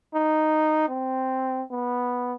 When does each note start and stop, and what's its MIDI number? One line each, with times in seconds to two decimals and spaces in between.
0.14 0.84 63
0.89 1.62 60
1.71 2.33 59